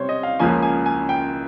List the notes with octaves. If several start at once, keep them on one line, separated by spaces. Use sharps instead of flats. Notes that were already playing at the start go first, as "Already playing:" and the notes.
Already playing: C3 G3 C5 C#5
D#5
F5
C#2 C#3 F3 A#3 C#4 G#5
G#5
G#5
G5